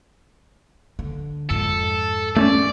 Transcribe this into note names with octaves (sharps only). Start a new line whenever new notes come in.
D3
F2 G#2 A4
A3 C4 C#4 D5